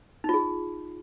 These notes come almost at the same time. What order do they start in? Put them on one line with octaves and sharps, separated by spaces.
D#4 F4 G#4